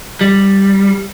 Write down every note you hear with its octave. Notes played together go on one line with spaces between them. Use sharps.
G3